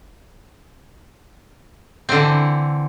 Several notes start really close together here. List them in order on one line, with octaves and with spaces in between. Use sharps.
C4 D3 E3